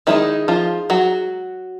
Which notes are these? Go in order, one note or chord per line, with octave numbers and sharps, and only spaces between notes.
D#3 G#3 C4 D#4 E4
F3 F4
F#3 F#4